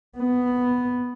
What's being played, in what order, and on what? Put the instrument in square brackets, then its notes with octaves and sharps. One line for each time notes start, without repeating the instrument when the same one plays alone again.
[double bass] B3